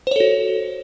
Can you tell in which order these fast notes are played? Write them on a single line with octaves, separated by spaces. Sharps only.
C5 C#5 A4 F#4